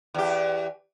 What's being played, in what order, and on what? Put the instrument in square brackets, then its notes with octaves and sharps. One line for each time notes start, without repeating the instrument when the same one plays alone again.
[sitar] E2 G4